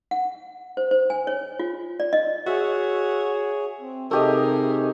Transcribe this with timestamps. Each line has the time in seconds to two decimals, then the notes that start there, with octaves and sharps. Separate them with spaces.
0.11 F#5
0.77 C5
0.91 C5
1.10 G#5
1.27 C#5
1.59 F4
2.00 D5
2.13 D#5
2.47 F#4 G#4 C#5 E5
3.81 C4
4.11 C3 A3 D#4 G4 G#4 A#4 D#5